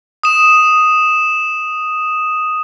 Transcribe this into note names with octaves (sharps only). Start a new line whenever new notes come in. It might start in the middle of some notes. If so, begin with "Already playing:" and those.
D#6 E7